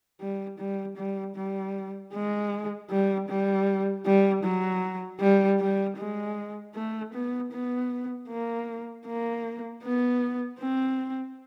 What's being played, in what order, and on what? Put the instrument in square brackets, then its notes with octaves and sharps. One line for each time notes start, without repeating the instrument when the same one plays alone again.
[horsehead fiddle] G3
G3
G3
G3
G#3
G3
G3
G3
F#3
G3
G3
G#3
A3
B3
B3
A#3
A#3
B3
C4